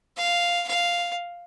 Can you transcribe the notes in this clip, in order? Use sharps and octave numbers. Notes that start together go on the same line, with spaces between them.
F5
F5